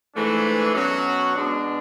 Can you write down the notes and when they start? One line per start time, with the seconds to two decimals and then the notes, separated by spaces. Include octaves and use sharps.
0.15 G#2 E3 A3 D4 G#4
0.75 B2 F#3 C#4 F#4
1.35 B2 G#3 D4